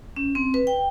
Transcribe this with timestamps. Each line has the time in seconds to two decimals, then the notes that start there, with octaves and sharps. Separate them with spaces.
0.16 C#4
0.35 C4
0.54 B4
0.67 G5